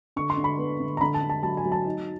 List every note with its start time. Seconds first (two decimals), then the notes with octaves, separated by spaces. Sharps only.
0.16 D3 C#6
0.30 C6
0.37 D3
0.44 B5
0.58 B3
0.80 D3
0.97 A#5
1.01 D3 B5
1.14 A5
1.23 D3
1.30 A5
1.43 F#3 A5
1.57 G#5
1.65 F#3
1.72 A5
1.85 D#4